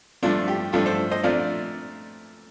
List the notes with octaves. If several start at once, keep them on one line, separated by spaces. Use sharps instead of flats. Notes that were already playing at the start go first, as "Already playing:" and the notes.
G2 F3 A3 D4 F4
G4
G2 F3 A3 D4 F4 A4
A4 C5
C5 D#5
A#2 F3 A3 D4 D5 F5